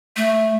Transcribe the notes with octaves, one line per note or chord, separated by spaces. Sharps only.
A3